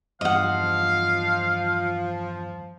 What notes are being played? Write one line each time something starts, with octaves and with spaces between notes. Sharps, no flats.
E2 G2 F3 D#5 F5 F#5